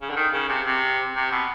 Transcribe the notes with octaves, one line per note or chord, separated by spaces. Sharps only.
C#3
D3
D#3
C#3
C3
C3
C3
B2